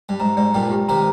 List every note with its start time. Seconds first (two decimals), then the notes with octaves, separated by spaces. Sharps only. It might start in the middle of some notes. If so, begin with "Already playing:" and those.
0.09 G2
0.20 G#2 A#5
0.37 G#2 D5
0.54 G2 A#2 G5
0.71 G4
0.88 C3 D#3 A#5